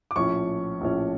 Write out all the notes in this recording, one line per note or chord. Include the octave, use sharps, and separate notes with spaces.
D6
A#1 A2 F3 C#4 C#6
A#1 A2 F3 C#4